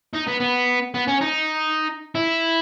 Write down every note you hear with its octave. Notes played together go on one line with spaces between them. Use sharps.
D#4
B3
B3
B3
C#4
D#4
E4